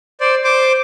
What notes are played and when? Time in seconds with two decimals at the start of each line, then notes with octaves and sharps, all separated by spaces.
0.20 C5 D5
0.44 C5 D6